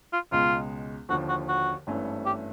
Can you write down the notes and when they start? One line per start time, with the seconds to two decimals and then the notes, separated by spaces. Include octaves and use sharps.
0.13 F4
0.32 C#2 B2 G#3 F4
1.09 D#2 D3 F3 F#4
1.29 F#4
1.49 F#4
1.87 G#1 G2 E3 A3 C#4
2.26 G4